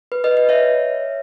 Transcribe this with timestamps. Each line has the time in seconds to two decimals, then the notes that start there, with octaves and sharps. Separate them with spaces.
0.12 B4
0.24 B4 D#5
0.37 B4
0.49 C#5 E5